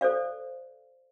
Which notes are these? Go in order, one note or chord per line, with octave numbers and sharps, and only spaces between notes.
A4 C5 D5 F5